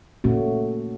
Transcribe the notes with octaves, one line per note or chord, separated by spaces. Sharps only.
A#2 A3 C#4 F#4